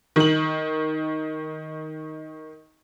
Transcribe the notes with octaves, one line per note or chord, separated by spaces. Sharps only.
D#3 F#7